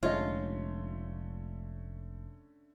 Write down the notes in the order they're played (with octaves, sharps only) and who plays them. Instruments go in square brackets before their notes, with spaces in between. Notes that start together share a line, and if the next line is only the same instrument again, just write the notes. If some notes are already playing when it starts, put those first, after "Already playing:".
[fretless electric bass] F1 G#3 [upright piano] D3 A3 C#4 [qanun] F4 [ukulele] C#5 D#5